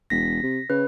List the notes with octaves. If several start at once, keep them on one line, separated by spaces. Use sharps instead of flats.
E1 A#6 B6
C3
C#3 B4